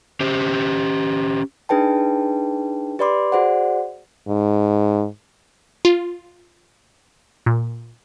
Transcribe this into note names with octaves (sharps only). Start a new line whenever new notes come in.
C#4 G4 C5
D4 D#4 G#4 B4 G5 A5
G4 B4 D5 B5 C6 D6
F#4 G#4 C5 D5 F#5
G#2
F4
A#2